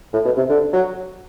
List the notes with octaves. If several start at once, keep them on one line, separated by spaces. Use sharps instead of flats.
A2
B2
C3
D3
F#3